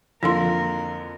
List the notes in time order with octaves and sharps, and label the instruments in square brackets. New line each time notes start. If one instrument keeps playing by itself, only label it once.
[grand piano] F2 D3 F4 [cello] A#3 A#4 [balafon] E4 A4 C6